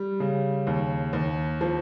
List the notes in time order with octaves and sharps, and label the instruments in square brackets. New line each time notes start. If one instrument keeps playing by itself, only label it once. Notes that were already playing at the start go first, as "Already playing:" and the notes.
Already playing: [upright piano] G3
C#3
D#2
D#2
F3